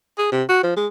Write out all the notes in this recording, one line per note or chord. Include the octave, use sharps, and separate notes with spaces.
G#4
C3
F#4
F3
G#3